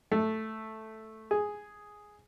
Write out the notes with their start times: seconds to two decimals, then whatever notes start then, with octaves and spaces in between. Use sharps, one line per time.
0.12 A3
1.31 G#4